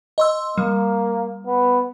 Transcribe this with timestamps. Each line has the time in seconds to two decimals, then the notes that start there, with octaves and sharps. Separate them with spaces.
0.18 D#5 C6 E6
0.58 G3 A#3
1.46 B3